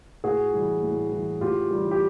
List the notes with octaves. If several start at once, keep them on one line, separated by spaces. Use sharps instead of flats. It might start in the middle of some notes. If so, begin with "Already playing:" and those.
A2 F#4 G#4
E3 G3
A2
E3 G3
A2 F4 G4
E3 G3
G4